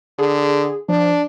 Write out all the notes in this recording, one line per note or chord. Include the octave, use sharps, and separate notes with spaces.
D3 G#4
F3 D4